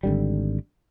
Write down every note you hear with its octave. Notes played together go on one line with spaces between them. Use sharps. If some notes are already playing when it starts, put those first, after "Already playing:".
G#1 D3 G3